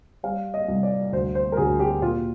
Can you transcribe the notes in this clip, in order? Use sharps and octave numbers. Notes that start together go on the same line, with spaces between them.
G3 F5
D#5
C2
D5
D2 C5
C5
A#4
D2 G#4
G4
A#2 F4